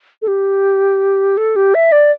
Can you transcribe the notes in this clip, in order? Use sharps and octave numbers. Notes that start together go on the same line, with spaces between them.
A4
G4
A4
G4
E5
D5